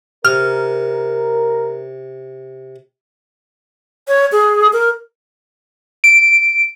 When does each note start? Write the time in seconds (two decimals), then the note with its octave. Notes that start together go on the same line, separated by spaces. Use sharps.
0.25 C3 A#4 F6
4.08 C#5
4.32 G#4
4.73 A#4
6.04 D7